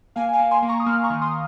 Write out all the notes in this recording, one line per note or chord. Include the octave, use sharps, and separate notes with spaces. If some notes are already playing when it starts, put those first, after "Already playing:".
A#3 F5 G#5
F5 G#5
A#3
G#5 C6
A#3
A#5 C#6
D#6
A#3 C#6 F6
A#5 C#6
D#3
C6 D#6